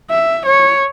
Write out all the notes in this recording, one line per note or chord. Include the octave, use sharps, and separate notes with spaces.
E5
C#5